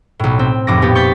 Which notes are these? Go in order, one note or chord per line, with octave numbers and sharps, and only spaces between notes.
B1 A2
C4
F1 A2 D6 A#6
A#2 B3 G4
C#6 G6 A6 B6